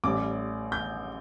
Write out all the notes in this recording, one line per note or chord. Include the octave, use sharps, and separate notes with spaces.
A1 A2 G3 D6
G6